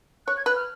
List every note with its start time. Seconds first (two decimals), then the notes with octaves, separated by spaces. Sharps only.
0.27 C#5 F#6
0.37 G#6
0.45 B4 F#6
0.56 F6